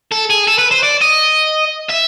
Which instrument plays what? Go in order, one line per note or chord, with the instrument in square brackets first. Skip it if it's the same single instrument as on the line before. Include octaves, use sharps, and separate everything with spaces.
[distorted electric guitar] A4
G#4
A4
B4
C5
D5
D#5
E5